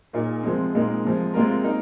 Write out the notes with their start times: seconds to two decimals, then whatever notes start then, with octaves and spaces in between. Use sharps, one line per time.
0.13 A#2 A#3 D#4 G#4
0.43 C3 F3 G#3 C4
0.75 A#2 G#3 C4 D#4 A#4
1.05 C3 F3 G#3
1.34 C3 G#3 C4 F4 A#4
1.64 A#3 D#4 A#4